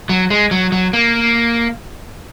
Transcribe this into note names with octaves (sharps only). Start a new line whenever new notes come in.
F#3
G#3
F#3
F#3
A#3